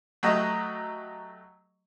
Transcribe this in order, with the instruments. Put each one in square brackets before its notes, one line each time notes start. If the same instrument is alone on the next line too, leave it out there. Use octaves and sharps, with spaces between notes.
[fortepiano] F#3 A3 G4 D#5